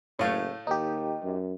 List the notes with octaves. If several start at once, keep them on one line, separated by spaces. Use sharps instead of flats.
F#1 A2 A3 C#5 F5
D#2 D#4 G4
F#2